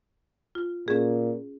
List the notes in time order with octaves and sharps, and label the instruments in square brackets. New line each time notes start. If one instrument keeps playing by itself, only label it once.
[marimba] F4
[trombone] A#2 [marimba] C#4 G#4